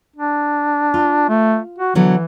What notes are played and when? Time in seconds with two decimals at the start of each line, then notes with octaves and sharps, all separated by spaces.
0.16 D4
0.94 F4
1.29 A3
1.78 F#4
1.95 D3 E3 F#3 B3